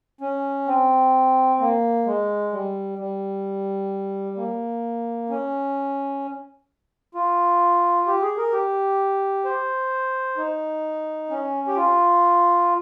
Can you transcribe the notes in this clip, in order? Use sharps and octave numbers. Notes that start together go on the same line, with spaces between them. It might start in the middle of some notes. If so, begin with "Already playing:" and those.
C#4
C4
A#3
G#3
G3
G3
A#3
C#4
F4
G4
G#4
A#4
G4
C5
D#4
C#4
G4
F4